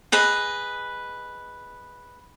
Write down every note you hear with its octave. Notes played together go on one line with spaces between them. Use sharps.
G#4 B4 D#5